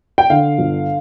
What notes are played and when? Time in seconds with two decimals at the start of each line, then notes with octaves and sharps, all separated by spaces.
0.18 G5
0.30 D3 F5
0.59 G1